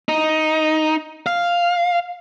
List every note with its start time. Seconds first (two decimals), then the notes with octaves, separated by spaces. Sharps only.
0.09 D#4
1.26 F5